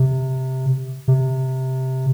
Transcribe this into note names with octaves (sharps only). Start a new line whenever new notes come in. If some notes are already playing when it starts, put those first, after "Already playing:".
Already playing: C3
C3